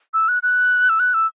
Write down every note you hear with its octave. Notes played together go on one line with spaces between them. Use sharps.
E6
F#6
F#6
E6
F#6
E6